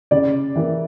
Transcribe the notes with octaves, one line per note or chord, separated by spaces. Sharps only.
C#3 D5
E3 A#3